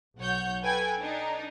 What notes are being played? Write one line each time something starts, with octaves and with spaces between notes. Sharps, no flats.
B1 C#5 F#5 G6
A4 B4 G5 G#5 G#6
D4 D#4